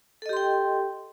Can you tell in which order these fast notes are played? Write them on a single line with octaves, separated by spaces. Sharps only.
A4 D#5 G4 C6 G5